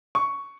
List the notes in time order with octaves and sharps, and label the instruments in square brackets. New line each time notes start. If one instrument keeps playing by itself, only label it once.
[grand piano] C#6